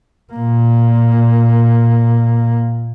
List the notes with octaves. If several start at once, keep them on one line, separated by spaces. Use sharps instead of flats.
A#2 A#3